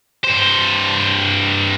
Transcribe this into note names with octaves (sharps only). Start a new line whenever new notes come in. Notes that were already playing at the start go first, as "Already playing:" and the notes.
G2 C5